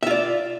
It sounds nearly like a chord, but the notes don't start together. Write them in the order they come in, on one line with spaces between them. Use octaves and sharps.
E5 F4 D5